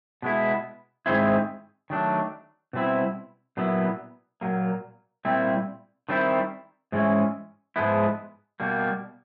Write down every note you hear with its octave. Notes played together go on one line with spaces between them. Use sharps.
B2 G#3 B3 E4
G#2 D#3 G#3 C4 E4
D#3 F#3 A3 D4
B2 G3 C4 E4
A#2 F#3 B3 E4
A#2 F#3 A#3
A#2 G3 C4 E4
D#3 G3 C4 E4
G#2 E3 G#3 C#4 E4
G#2 F3 G#3 B3 E4
B2 G3 A#3